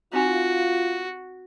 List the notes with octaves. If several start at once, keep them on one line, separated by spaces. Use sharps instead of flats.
C4 D#4 F4 F#4 G#5